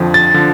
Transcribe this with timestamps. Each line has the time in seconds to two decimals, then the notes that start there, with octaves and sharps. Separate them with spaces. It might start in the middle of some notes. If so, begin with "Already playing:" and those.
Already playing: F2 D3 F3
0.14 A6
0.34 D3 F3